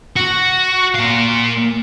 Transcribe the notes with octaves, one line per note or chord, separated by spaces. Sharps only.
F#4
A#2 F5